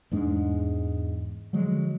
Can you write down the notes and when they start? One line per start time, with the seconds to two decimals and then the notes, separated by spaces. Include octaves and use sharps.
0.11 E2 G#2 G#3 D4
1.53 D3 F3 F#3 G#3